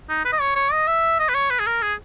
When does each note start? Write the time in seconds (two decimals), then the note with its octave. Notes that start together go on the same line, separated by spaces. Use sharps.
0.09 D#4
0.25 B4
0.33 D#5
0.41 C#5
0.55 C#5
0.72 D#5
0.87 E5
1.20 D#5
1.29 B4
1.34 C#5
1.50 B4
1.60 G#4
1.67 A#4
1.82 G#4